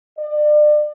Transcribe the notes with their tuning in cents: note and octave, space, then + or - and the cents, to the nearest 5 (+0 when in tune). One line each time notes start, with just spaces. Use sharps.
D5 +35